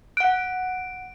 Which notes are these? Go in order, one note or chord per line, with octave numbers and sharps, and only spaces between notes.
F#5 F#6 D7